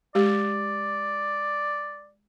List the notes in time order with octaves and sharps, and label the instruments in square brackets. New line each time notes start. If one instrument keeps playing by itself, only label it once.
[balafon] G#3 G4 [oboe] D5